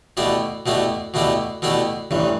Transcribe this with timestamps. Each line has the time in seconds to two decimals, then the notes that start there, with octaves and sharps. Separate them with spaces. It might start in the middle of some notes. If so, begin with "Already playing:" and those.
0.17 B2 A3 E4 G4 D5
0.66 B2 A3 E4 G4 D5
1.14 B2 A3 E4 G4 D5
1.62 B2 A3 E4 G4 D5
2.11 A1 G2 E3